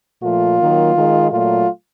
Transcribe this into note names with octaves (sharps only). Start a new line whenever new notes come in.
A#2 F3 A3 F4
D#3 F#3 A#3
D#3 G#3
A#2 F#3 A3 F4